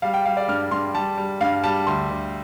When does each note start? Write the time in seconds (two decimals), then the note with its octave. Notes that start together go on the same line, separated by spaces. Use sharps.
0.02 G3 F5
0.14 G5
0.25 G3 F5
0.37 D5
0.48 G2 F6
0.71 G2 C6
0.94 G3 A5
1.17 G3
1.41 G2 F5
1.63 G3 A5
1.87 D2 C6
2.10 D2